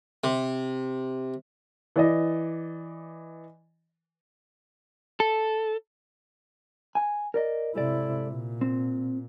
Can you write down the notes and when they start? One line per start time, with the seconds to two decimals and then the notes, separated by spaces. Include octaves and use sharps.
0.24 C3
1.96 E3 D5 D#5
5.20 A4
6.95 G#5
7.34 A#4 D5 D#5
7.75 G#2 C3 E4 A4 D5
8.27 A#2
8.61 C4